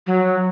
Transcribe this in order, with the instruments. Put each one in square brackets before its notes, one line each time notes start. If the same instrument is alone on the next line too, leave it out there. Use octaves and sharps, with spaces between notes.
[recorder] F#3